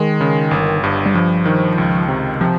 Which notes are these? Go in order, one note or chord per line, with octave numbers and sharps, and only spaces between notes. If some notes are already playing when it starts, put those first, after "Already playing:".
Already playing: D#3 G#3
C#3
G1
G2
G3
G2 F3
D#3
C#2
C3
C3 F3